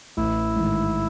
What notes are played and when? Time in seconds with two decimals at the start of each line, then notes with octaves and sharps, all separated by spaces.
0.17 A1 E4
0.56 G#2 D#3